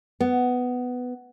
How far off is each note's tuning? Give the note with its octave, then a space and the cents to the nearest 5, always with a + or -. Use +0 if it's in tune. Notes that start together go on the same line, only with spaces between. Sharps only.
B3 +10